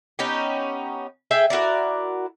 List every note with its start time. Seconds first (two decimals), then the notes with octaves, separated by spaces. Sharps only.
0.19 B3 C#4 D#4 G4
1.31 G#4 E5 G5
1.50 E4 F#4 A#4 D5